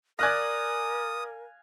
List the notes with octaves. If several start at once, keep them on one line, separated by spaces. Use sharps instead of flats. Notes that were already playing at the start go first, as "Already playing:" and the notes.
A#4 D5 F5 G#5 D#6 F#6 A#6